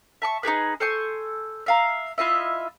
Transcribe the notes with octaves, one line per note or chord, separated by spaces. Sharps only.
E5 A5 C#6
D#4 G4 G#4 B4
A4 C5 G#5 C#6
E5 F5 A#5
E4 F4 D#5 E5